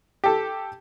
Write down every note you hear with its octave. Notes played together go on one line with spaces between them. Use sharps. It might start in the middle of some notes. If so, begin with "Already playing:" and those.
G4 A4